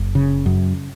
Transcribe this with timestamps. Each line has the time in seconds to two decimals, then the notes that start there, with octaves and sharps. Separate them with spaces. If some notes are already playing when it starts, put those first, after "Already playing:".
Already playing: F#1
0.15 C#3
0.46 F#2